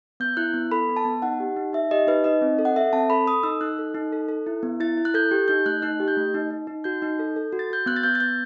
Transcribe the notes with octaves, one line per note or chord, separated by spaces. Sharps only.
B3 G6
E4 F#6
B3
A4 B5
B3
A5
B3
D#4 F#5
G4
D#4
D#4 E5
G4 D#5
D#4 B4
D#4 D#5
C4
A4
F#5
A4 E5
C4 A5
A4 B5
A4 D#6
D#4 E6
D#4 F#6
A4
D#4
A4
A4
E4
B3
E4 A6
E4
F#6
A4 G6
G4
D#4 G6
A3 F#6
D#4 F#6
G4
G6
A3
D#4
D#4
D#4
F#4 G6
D#4
A4
A4
F#4
A6
F#4 G6
B3 F#6
A6
B3 G6
A6
B3 G6